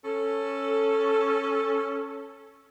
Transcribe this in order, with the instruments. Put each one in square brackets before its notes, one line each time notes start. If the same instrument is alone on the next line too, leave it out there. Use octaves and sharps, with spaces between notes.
[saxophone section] C#4 A4